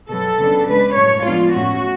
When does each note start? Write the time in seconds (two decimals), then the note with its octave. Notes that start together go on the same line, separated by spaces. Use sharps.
0.09 B2 F#3 B3 A4
0.39 C#3 F#3 B3 D4
0.67 C#3 G#3 D4 B4
0.96 A2 F#3 A3 C#5
1.25 G#2 F3 G#3 B3 D4 F4
1.54 A2 F#3 A3 C#4 F#4